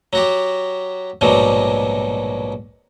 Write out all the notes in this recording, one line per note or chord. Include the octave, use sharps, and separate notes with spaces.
F#3 F#4 G4
A#1 G#2 B2 F#3 G3